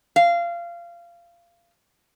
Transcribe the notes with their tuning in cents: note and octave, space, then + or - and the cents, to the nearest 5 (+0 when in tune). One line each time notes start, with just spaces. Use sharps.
F5 -20